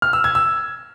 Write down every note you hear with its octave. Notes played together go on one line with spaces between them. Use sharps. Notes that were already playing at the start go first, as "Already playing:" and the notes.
F6
E6
G#6
E6